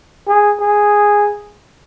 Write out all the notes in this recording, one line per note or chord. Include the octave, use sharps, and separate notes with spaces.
G#4
G#4